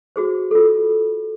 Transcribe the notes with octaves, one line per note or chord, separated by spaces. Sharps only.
F#4 G#4 C5
F4 A4